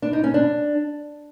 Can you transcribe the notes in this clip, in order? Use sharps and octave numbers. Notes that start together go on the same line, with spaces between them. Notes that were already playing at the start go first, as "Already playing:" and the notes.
D4
D#4
C#4
D4